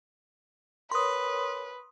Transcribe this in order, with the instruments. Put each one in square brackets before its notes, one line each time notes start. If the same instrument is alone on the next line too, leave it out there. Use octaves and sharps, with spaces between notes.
[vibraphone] A#4 C#5 [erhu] B4 [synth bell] C6 D#6